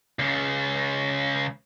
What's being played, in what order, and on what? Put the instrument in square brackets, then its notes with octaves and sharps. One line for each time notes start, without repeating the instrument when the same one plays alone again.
[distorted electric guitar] C#2 C#3